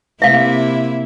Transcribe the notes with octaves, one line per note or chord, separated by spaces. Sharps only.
C3 A#3 E4 E5 F5